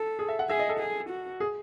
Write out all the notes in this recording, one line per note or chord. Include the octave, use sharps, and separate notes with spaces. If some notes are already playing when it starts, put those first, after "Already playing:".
Already playing: A4
G#4
E5
F#5
G#4 E5
D#5
A4
G#4
F#4
G#4